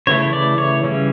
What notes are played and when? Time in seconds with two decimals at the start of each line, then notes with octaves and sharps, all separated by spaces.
0.07 C#3 E3 A3 E4 C#5
0.33 D5
0.58 C#5
0.83 C#3 E3 G3 C#4